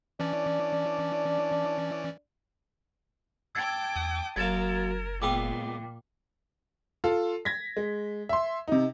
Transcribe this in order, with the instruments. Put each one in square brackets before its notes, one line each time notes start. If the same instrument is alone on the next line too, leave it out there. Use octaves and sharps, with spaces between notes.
[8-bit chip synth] E3 C#4 D5 [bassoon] D4
[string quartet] G5 A5 D6 [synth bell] E6 G#6 A6
[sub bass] E2 [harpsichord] D#6
[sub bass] F#1 [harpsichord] F#2 A#3 [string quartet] A#4 [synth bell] G#6 A6 E7
[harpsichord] C#2 B3 C6 [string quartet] A#2 [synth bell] G5 D6
[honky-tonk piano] F4 A4
G#6 A#6 B6
G#3
E5 C6
C3 D#4